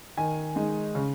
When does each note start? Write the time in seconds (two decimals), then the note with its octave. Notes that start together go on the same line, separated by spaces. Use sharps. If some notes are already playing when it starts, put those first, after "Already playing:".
0.17 D#3 G#5
0.56 G#3 D#4
0.95 C#3